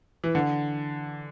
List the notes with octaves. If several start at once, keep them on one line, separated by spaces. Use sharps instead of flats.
E3
D3